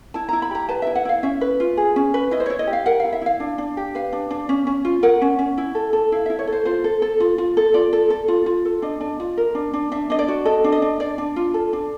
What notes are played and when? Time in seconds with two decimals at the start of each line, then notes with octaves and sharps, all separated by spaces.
0.14 E4 A5
0.29 E4 A#5
0.42 B5
0.51 G4 A#5
0.69 B4 A5
0.82 E4 E5
0.95 F#5
1.05 E4 F5
1.23 C#4 E5
1.41 B4
1.60 F4
1.77 G#4
1.96 C#4
2.14 B4
2.31 E4 D#5
2.40 C5
2.46 E4 C#5
2.59 D#5
2.67 G4
2.73 F5
2.86 A#4 F#5
3.00 E4 F5
3.13 E5
3.22 E4 F5
3.40 D4
3.58 D4
3.77 G4
3.95 B4 F5
4.13 D4
4.31 D4
4.49 C#4
4.67 C#4
4.85 F4
5.03 A#4 F#5
5.22 C#4
5.39 C#4
5.58 E4
5.75 A4
5.93 A4
6.12 E4 F5
6.26 E4 E5
6.39 C#5
6.47 A4 C5
6.65 F4 C5
6.84 A4
7.02 A4
7.20 F4
7.38 F4
7.57 A4
7.74 F4 D5
7.93 A4
8.10 A4
8.28 F4
8.46 F4
8.65 A4
8.82 D4 D#5
9.00 D4
9.20 F4
9.37 A#4
9.55 D4
9.73 D4
9.92 D4 E5
10.10 D4 D#5
10.19 D5
10.28 F#4
10.45 A4 D#5
10.64 D4
10.72 D#5
10.82 D4
11.00 D4 D5
11.18 D4
11.36 F4
11.54 A4
11.73 D4